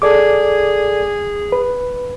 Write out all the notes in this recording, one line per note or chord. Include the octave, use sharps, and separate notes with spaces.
G#4 A4 D5 D6
B4